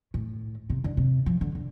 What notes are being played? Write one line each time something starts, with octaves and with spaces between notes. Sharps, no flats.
A2
C3
D3
C3
F3
D3
D3